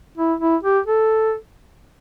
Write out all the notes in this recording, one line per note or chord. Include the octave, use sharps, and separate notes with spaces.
E4
E4
G4
A4